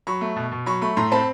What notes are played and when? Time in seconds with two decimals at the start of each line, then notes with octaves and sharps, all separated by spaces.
0.07 F#3 B5 C#6
0.21 A3
0.36 B2
0.51 B2
0.66 F#3 B5 C#6
0.82 A3 B5 C#6
0.97 A2 A#5 C6
1.12 C4 A5 B5